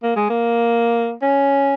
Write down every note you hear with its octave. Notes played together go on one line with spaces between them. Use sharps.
A#3
G#3
A#3
C#4